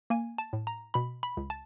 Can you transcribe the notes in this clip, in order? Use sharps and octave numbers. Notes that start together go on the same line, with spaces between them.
A#3 G#5
A5
A2
A#5
B2 B5
B5
C#2
A5